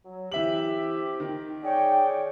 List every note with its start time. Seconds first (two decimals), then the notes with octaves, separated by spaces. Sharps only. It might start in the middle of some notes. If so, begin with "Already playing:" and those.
0.05 F#3
0.32 E3 C4 G4 E5 F#7
1.20 D#3
1.64 G#4 C#5 D5 G5